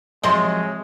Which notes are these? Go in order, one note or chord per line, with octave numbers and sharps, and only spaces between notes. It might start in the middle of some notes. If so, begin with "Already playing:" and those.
C3 F3 F#3 G#3 D#5 C6